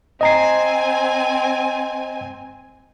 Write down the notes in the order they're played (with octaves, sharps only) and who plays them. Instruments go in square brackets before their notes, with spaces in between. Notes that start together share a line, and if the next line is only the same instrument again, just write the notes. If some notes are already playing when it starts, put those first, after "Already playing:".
[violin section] C4 G#5 [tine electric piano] D#5 A#5 C7